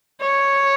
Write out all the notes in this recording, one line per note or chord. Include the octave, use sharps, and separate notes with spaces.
C#5